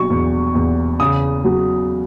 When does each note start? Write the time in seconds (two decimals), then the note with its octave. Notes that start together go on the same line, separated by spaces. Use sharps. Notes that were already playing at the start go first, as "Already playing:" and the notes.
Already playing: B2 F#3 C#6
0.10 E2
0.55 E2
0.99 C#3 D#6
1.44 F#3